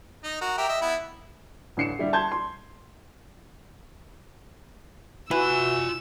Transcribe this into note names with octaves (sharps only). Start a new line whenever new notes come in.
D#4 D#5
F#4 A#4
G4 A#4 E5
D#5 E5
B3 E4
A1 D3 C7 C#7 E7
D3 G3 E4 G4
A5 C6 G6 G#6
C6
E3 F4 F#4 G#5 E6